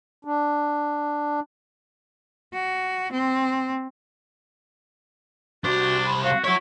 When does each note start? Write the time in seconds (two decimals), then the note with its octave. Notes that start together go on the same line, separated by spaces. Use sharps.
0.25 D4
2.53 F#4
3.12 C4
5.64 C2 D4 F#4 C5
6.06 B5
6.24 F#4 F5
6.44 E4 F#4 C#5 C#6